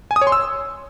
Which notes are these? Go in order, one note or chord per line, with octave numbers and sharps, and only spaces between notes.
G#5
D#6
C#5
C6
E6